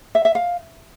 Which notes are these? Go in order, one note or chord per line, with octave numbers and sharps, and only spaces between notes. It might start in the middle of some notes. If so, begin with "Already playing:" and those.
E5
E5
F5